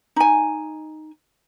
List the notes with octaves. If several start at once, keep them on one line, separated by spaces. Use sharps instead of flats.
D#4 G#5